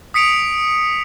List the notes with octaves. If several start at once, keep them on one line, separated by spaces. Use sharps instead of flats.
D#6 B6 C#7 D7 F7